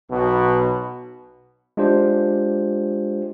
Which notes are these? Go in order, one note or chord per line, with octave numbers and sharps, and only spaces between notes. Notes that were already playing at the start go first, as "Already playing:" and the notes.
B1 B2
G#3 D4 F4 G4 C5